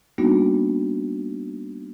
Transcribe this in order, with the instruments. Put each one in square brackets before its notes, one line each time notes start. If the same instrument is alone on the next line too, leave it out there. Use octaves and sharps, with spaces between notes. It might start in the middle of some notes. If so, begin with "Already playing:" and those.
[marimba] G3 A#3 B3 D4 D#4 F#4